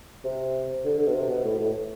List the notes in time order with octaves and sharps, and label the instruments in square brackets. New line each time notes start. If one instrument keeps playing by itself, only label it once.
[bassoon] C3
D3
D3
B2
C3
B2
A2
A2